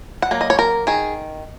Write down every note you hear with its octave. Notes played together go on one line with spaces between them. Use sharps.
F#5
F#3 A#3
D#5
C#5
A#4
D#3 G#4